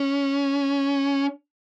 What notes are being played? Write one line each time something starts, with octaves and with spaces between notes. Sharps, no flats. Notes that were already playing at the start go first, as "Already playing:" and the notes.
Already playing: C#4